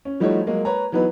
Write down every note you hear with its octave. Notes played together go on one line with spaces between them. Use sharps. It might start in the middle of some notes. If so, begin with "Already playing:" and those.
C#4
F3 G3 A3 D#4 F#4 C#5
F#3 G#3 A#3
B4 C#5 A#5
E3 F#3 B3 D#4 B4